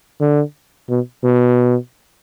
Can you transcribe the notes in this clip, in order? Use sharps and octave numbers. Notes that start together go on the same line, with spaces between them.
D3
B2
B2